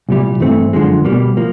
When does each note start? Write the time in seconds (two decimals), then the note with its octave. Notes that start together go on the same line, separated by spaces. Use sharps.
0.09 C2 A#2 G3
0.40 G2 E3 A3 C4
0.73 F#2 D3 F3 G#3
1.05 B2 G3 A#3
1.37 F3 A#3